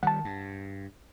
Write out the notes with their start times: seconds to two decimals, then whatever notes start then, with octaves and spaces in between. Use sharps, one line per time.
0.03 D#3 G3 F#5 A5
0.25 G2